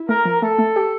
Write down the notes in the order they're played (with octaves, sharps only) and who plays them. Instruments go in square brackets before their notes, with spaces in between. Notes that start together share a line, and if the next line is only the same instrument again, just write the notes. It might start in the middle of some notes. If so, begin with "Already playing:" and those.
Already playing: [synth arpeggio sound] E4
[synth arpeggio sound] A3 [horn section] A#4
[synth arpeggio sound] F3
[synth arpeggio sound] A3 [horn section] A4
[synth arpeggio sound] A3
G4